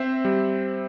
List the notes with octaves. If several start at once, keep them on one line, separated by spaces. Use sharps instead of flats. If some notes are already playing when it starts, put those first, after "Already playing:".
Already playing: C4 C5 E5
G3